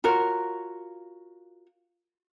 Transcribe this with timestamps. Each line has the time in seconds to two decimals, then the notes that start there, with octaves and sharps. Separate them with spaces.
0.04 F4 F#4 A#4 C#5